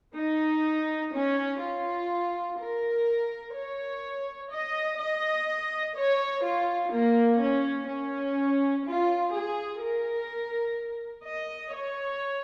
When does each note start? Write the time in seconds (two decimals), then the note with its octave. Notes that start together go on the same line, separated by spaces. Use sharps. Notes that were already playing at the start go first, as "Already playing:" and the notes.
0.15 D#4
1.13 C#4
1.60 F4
2.58 A#4
3.54 C#5
4.51 D#5
4.98 D#5
5.95 C#5
6.43 F4
6.92 A#3
7.39 C#4
7.88 C#4
8.85 F4
9.32 G#4
9.80 A#4
11.27 D#5
11.74 C#5